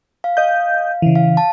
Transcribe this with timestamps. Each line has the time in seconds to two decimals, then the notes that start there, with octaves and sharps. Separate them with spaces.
0.24 F5
0.37 D#5 F5 G6
1.02 C#3 E3
1.15 F5
1.37 A5